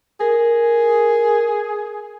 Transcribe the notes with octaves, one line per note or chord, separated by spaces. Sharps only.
G#4 A#4